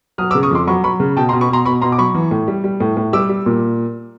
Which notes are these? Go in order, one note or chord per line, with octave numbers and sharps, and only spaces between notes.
F#3 D#6 F6
D6 E6
C#3
C#6 D#6
F2 C6 D6
F#3 B5 C#6
F#3 B5 C#6
C#3
B2 G5 A5
A#5 C6
B2
B5 C#6
B2 A#5 C6
B2 B5 C#6
B2 A#5 C6
D6
F#3 B5 C#6
E3
A2
G3
G3
A2
A2
G3 D6 E6
G3
A#2